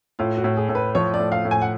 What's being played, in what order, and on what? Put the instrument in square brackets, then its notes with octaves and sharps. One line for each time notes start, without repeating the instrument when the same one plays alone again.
[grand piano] A2 [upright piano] F4
[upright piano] F#4
[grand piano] A2
[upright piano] G#4
[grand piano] A2
[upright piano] B4
[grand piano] F3 [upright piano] C#5
[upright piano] D5
[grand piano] A2
[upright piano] F5
[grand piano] A2
[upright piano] G#5
F#5